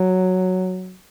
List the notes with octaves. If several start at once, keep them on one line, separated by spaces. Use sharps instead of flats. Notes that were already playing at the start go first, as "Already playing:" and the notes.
Already playing: F#3